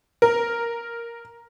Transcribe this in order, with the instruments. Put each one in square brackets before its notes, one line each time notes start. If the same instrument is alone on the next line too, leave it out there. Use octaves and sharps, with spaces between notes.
[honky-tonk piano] A#4